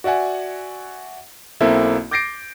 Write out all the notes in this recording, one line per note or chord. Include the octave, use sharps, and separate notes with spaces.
F#4 D5 E5 F#5 G#5
B1 A#3 C4 E4 A4 E5
D6 G6 A6 A#6 C7 D7